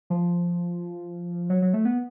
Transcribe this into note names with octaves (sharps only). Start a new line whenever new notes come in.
F3
F#3
F#3
A3
B3